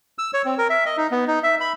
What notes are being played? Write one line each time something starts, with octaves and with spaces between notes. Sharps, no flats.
E6
C#5
C4
A#4
E5
D#5
D#4
B3
D#4
E5
B5